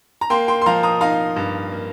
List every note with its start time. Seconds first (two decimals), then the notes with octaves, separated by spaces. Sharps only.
0.21 A#5
0.30 A#3 G5 C6
0.48 G5 C6
0.62 C6
0.66 F3 F5 A#5
0.83 A#5 D#6
1.01 D#4 F5 A#5
1.36 G2
1.72 A#3